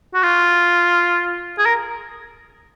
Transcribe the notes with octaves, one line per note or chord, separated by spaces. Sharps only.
F#4
F4
G#4
A#4